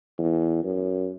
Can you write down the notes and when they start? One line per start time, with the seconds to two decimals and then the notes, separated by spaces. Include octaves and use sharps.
0.18 E2
0.64 F#2